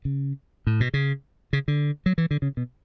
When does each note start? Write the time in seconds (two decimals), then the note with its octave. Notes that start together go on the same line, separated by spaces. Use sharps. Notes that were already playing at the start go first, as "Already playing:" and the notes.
0.05 C#3
0.67 A2
0.80 B2
0.94 C#3
1.53 C#3
1.68 D3
2.06 F#3
2.18 E3
2.31 D3
2.42 C#3
2.57 B2